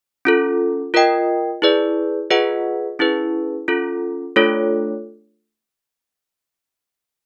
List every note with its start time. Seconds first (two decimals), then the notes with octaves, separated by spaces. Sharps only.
0.25 C#4 F4 A4
0.94 F4 A#4 D#5 G5
1.62 E4 G#4 B4 D5
2.31 F4 G#4 B4 D#5 F#5
2.99 C#4 E4 G#4 B4
3.68 C#4 F4 A4
4.36 A3 D4 F4 A4 C#5